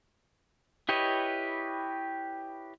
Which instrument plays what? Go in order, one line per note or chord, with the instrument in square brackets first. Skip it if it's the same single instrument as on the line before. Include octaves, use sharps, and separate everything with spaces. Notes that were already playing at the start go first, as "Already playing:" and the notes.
[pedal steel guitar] E4 G4 B4 C#5 D#5